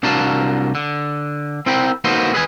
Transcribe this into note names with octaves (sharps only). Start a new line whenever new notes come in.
C2 D4 F#4 A#4 F5 A5
D3
C4 E4 A#4 G5 B5
A#3 D#4 F#4 A4 B4 C5
G#4 B4 D#5 G#5